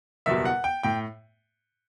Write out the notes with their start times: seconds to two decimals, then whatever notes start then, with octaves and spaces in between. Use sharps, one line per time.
0.26 F#1 E2 B2 G3 E5
0.45 F#5
0.64 G5
0.83 A2 G5